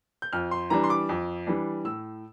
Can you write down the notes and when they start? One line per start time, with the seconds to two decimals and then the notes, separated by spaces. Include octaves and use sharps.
0.22 G6
0.33 F2 F6
0.51 C6
0.70 E3 G3 D4 A#5
0.84 C6
0.90 D6
1.09 F2
1.47 E3 G3 D4
1.85 A2 E6